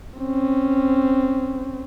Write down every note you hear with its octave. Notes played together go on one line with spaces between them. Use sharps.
C4 C#4